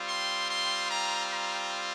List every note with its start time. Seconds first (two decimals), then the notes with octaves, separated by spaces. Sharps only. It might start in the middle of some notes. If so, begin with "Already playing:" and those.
Already playing: G3 C4 F4
0.09 C6
0.49 C6
0.90 A#5
1.31 A#5